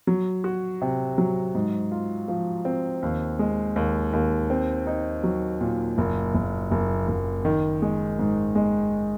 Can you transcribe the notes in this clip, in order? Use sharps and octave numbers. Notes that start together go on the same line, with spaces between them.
F#3
F#4
C3
F#3
G#2
F4
F3
C4
D#2
G#3
D#2
D#2
C4
D#4
F#3
A#2
F#1
F#1
F#1
F#1
D#3
G#3
G#2
G#3